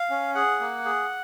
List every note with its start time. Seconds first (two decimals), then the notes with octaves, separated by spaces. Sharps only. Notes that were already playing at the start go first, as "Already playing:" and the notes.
Already playing: F5
0.10 C#4
0.35 G#4 F#5
0.60 A#3
0.85 G#4